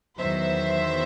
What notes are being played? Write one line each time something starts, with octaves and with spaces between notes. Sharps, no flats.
E2 D#3 F#3 B3 C5 E5